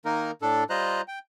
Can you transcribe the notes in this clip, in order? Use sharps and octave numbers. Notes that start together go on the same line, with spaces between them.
D#3 A#3 D#4 A#4
A2 D4 A4
G3 F4 C5 D#5 A#5 F#6
G5